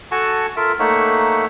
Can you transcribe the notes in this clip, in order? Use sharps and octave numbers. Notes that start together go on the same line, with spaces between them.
F#4 A4 F#5 G#5 A5 C#6
F4 A4 A#4 E5
A3 A#3 D#4 C#5 E5 F#5